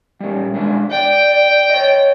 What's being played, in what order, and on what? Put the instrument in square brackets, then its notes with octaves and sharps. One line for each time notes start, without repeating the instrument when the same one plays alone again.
[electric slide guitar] G3 C#4
G#3 D4 E5
[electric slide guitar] D5 [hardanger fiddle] G5
[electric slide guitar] C#5 D#5